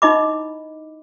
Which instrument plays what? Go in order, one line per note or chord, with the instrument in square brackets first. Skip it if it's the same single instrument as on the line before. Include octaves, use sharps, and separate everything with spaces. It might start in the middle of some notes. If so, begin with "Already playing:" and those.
[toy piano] D#4 E4 D#5 B5 D6